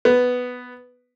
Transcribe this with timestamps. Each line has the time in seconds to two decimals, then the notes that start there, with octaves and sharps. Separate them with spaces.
0.05 B3